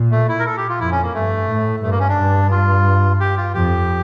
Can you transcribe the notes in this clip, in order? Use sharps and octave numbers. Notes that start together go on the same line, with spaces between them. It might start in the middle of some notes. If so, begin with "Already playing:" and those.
Already playing: A#2
A3
E4
A#4
A4
G4
F4
F2 E4
C#4
A#3
G2 A3
A2
G2 A3
A#3
C#4
D4
G2
F4
G4
F4
F2 G4